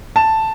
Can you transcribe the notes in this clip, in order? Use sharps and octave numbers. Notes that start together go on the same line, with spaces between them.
A5